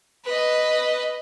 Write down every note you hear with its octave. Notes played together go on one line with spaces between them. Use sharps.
B4 D#5